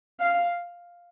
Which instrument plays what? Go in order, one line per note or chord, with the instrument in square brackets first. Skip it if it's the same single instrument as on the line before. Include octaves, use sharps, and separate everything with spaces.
[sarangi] F5